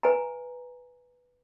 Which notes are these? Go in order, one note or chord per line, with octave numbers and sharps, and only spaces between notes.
B4 G#5 A#5